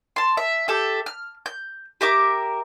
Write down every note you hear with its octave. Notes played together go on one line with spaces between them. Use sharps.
A5 C6
E5
G4 A4 E5
F6
G6
G4 A#4 E5 D6